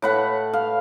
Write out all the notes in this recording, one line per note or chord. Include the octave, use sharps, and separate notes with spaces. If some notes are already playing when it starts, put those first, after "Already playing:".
A2 B4 F#5
F5